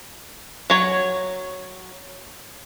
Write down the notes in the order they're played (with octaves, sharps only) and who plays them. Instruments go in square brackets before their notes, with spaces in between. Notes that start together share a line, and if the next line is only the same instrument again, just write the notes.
[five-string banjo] F#3 C#5